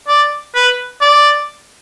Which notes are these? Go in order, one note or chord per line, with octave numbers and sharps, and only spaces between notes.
D5
B4
D5